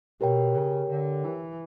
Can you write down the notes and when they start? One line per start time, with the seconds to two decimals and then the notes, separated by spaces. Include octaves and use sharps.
0.21 B2 G4 A#4 C#5 G5
0.55 C#3
0.90 D3
1.24 E3